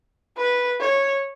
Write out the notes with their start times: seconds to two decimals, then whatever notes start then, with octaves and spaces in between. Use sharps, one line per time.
0.37 B4
0.81 C#5